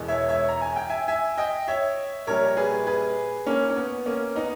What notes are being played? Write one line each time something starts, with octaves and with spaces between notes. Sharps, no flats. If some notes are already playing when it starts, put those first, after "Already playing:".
Already playing: E1 E2 B2 G#3
C#5 E5
C#5 E5
A#5
G#5
G5
E5 G#5
E5 G#5
D#5 G5
C#5 E5
A#1 A#2 G3 A#4 C#5
G#4 B4
G#4 B4
A#3 C#4
C#4
B3
A#3 C#4
B3 D#4